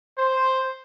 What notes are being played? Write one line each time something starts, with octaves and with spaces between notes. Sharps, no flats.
C5